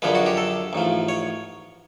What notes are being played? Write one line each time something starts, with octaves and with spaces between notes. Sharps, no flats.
F#2 D3 F3 G#3 B4
F#4
G4
A4
A1 G#2 F3
C#5